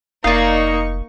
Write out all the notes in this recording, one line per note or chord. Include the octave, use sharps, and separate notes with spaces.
F1 A#3 D#4 D5 F5 C#6